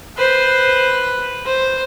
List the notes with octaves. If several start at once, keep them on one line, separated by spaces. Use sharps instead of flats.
B4 C5
C5